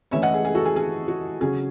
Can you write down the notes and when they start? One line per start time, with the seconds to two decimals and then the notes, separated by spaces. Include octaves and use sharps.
0.11 E3 A3 C#4 E4 C#5 E5
0.22 D#5 F#5
0.34 G#4
0.45 G#4
0.55 F#4 A4
0.65 G#4
0.76 G#4
1.08 F#4
1.41 C#3 F#3 C#4 G#4